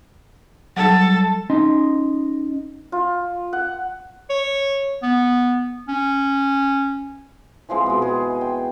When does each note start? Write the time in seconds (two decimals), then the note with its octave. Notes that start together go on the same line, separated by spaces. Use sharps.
0.77 F#3 G3 A4
1.50 C#4 D#4 D#5 C6
2.92 F4
3.53 F#5
4.30 C#5
5.02 B3
5.88 C#4
7.69 E3 F3 G#3 C4
7.86 B2 G#3
8.02 G#4
8.41 G5